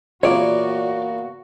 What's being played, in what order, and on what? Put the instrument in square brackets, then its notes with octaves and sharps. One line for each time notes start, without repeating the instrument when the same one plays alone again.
[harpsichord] E2 A#2 [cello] F#4 [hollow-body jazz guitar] C#5 D5